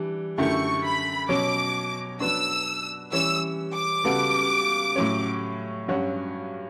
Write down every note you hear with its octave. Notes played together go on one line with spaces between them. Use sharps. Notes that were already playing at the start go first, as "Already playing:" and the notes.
Already playing: E3 G3 D4
F#2 D3 A3 E4 G4 C#6
B5
B2 F#3 C#4 D6
F#3 B3 D4 E6
E3 G3 C#4 E6
D6
C#3 G3 B3 F#4 A4
A2 F#3 C#4
G2 F#3 C#4 F#4